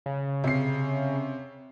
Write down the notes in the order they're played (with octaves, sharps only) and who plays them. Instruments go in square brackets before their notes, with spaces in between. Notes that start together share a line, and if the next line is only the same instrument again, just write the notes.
[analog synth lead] C#3
[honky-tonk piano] C3 C7